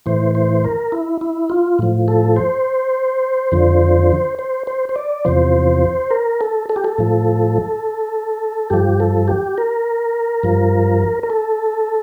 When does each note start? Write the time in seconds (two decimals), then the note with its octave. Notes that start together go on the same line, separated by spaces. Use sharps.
0.06 A2 E3 C5
0.35 C5
0.64 A#4
0.92 E4
1.21 E4
1.50 F4
1.79 A2 F3
2.08 A4
2.36 C5
3.52 F2 D3 F3
4.39 C5
4.67 C5
4.89 C5
4.96 D5
5.25 E2 C3 F3 C5
6.11 A#4
6.41 A4
6.69 A4
6.76 G4
6.84 A4
6.98 A2 F3
8.70 G2 F3 G4
9.00 A4
9.28 G4
9.58 A#4
10.43 G2 F3
11.23 A#4
11.30 A4